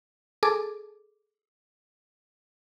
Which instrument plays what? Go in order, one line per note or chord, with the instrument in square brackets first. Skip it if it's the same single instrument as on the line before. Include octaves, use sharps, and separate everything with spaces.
[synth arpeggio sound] G#4 A4 D6